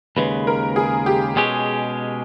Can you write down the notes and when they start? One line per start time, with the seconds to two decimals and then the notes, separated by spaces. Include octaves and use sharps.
0.16 D#2 C#3 G#3 B4
0.47 A#4
0.76 G#4
1.06 G4
1.36 B2 G#3 C#4 G4 G#4